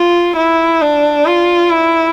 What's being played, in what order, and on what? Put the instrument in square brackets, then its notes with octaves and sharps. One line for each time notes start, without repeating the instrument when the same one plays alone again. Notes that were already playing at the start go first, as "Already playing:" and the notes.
Already playing: [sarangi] F4
E4
D4
F4
E4